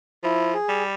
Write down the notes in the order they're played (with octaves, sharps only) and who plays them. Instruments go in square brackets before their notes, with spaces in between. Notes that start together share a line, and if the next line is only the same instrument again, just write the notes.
[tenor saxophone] F3 [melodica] E4
[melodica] G#4
[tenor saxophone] G3